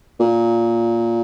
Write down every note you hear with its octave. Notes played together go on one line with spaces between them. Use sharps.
A#2